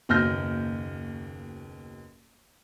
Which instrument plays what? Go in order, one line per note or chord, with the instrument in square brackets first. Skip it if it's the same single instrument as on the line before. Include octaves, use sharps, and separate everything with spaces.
[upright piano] F#1 D#2 B2 F6 G6 A#6